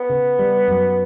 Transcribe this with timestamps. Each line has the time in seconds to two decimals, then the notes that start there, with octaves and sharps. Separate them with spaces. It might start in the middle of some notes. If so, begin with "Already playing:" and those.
Already playing: B3
0.09 C#3
0.39 G3
0.68 F#2